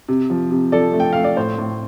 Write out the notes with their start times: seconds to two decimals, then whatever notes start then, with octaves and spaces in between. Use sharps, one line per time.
0.09 C3
0.30 F3
0.51 C3
0.72 F3 A4 D5
0.94 A3
1.00 G5
1.13 A3 F5
1.24 D5
1.37 A2 C5
1.58 A2